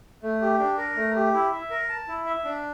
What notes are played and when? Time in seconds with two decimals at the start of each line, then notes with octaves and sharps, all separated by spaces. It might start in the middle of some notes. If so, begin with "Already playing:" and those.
0.23 A3
0.41 G4
0.60 D4
0.78 A#4
0.96 A3
1.16 G4
1.34 E4
1.53 E5
1.70 A#4
1.89 A5
2.08 E4
2.26 E5
2.44 D4